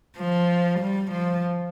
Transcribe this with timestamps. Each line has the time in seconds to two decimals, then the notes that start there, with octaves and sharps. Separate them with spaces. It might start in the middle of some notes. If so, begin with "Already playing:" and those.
0.18 F3
0.80 G3
1.12 F3